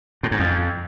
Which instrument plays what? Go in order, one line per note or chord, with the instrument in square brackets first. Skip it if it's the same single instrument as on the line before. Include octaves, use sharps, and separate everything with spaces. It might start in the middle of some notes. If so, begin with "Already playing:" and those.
[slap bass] A2
G#2
F2